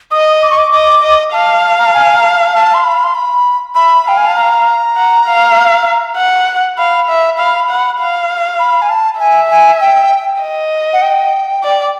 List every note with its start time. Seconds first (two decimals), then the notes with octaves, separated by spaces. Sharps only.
0.11 D#5 D#6
0.42 D6
0.50 C#6
0.58 D6
0.72 D#5 D6
1.02 D#5
1.33 F5 A5
1.79 A#5
1.86 A5
1.94 G#5
2.16 A#5
2.24 A5
2.54 A5
2.74 C6
2.84 B5
3.04 C6
3.15 B5
3.75 E5 B5
4.06 F5 G5
4.17 G#5
4.27 A5
4.36 A#5
4.96 F#5
5.26 F5
6.17 F#5
6.77 F5 B5
7.08 E5
7.38 F5
7.69 F#5
7.99 F5
8.59 B5
8.82 G#5
8.89 A5
9.19 E5 G#5
9.50 G#5
9.81 G5
10.42 D#5
10.93 F#5
11.02 G5
11.63 D5